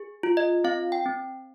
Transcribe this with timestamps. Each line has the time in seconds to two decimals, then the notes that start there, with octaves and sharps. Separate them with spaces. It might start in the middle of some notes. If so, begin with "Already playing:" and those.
Already playing: G#4
0.23 F4
0.37 D#5
0.64 C4 F5
0.92 G5
1.06 C4